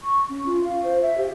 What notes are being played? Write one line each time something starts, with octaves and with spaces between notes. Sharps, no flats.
C#6
C#4
F4
F5
C5
E5
G4